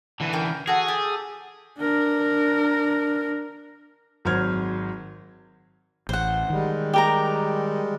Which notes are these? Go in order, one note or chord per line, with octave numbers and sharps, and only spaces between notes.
D3 E3
C#4 A#4 G5
F#4 G#4 A4 F#5
G4 A4
D4 A#4
G#1 F#3 C5 C6 F6 G#6
A1 C5 F#5
D#3 G3 G#3
G4 A#4 A#5